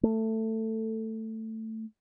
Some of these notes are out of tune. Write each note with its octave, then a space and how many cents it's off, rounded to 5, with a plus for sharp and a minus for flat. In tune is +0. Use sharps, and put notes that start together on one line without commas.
A3 +15